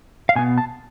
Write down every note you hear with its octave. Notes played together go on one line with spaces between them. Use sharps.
F5
B2 B3 G#5
A5